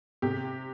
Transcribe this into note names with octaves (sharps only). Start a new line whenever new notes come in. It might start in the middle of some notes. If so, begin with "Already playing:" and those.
C3 G4